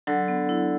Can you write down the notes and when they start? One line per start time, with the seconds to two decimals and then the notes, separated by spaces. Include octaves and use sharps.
0.07 D3 F#3
0.28 B3
0.49 E4